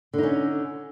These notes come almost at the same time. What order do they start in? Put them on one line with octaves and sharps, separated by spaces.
D3 D#4 C#4